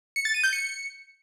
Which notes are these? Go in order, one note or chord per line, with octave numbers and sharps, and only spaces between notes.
C#7
A6
D#7
G6
C#7